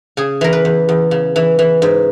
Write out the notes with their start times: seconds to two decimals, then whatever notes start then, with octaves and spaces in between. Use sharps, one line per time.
0.17 C#3 G#4
0.41 E3 A#4
0.53 B4
0.65 E2
0.89 E2
1.11 C#3
1.36 E3
1.59 E3
1.82 G#2